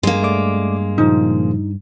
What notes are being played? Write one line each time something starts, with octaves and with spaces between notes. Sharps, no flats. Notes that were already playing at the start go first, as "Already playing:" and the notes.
G2 G#3 A#3
A3 D5 D6
A#2 C#3 F3 D#4